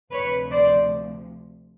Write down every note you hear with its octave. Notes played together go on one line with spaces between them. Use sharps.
D2 C3 F3 B4 C#5
C5 D5